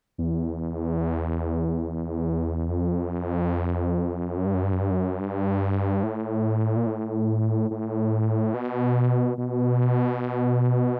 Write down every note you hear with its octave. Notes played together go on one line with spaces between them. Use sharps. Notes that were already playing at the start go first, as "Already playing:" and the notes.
E2
F2
F#2
G2
F#2
G2
F#2
G2
F#2
G2
A2
A#2
A2
A2
B2
B2